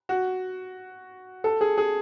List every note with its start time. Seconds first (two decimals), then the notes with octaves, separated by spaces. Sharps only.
0.09 F#4
1.44 A4
1.61 G#4
1.78 G#4